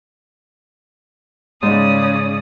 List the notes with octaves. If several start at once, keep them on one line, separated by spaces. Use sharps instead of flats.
G#2 C#3 D5 D#6